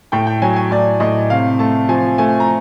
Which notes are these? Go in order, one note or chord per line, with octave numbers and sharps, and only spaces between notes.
A2 G5
G5
F#3 G#5
G#5
A2 D5
A2 D#5
C3 F5
A3 A5
F3 G#5
A3 G#5
A#5